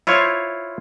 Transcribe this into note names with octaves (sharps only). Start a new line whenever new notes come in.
E4 F4 C5 C#5